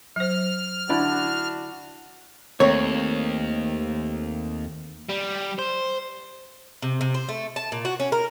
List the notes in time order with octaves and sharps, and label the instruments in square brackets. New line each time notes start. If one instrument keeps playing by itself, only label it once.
[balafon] F#3 C5 [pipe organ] F6
[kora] D3 E4 D5 [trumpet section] D4 F#4
[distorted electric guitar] D#2 [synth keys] A3 A#3 C4 [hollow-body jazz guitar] C#5
[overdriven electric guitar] G3
C5
[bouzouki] C3
C3
C5
A3
A5
A#2
F#4
C#4
A#4